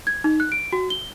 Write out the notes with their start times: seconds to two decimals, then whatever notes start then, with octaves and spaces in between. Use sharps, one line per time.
0.07 G#6
0.24 D#4
0.40 F#6
0.52 D7
0.73 F#4
0.90 G7